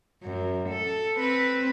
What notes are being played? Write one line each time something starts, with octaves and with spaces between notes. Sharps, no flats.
F#2
A4
C4 B4